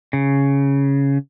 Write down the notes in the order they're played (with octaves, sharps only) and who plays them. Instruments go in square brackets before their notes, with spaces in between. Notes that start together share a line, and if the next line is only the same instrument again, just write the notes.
[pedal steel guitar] C#3